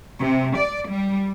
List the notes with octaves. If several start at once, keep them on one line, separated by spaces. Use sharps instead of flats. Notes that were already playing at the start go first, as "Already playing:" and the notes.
C3
D5
G3